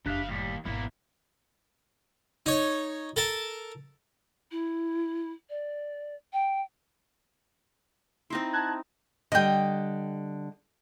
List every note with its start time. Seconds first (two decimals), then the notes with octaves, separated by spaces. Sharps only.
0.06 F#1 F2 C#3 D4 G4 E5 F5
0.29 D#2 A2 G3
0.65 G#1 E2 B2 A#3 E4
2.46 D#4 C#5
3.16 A4 A#4 A5
4.51 E4
5.50 D5
6.33 G5
8.30 C4 D#4 E4 C6
8.53 A5 F#6 G#6
9.32 D3 G3 D#5 G5